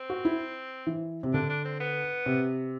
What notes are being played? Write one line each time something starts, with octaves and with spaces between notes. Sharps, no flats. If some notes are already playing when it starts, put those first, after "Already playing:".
Already playing: C4
F#4
E4
E3
C3
D3 D4
D4
C4
B3
C3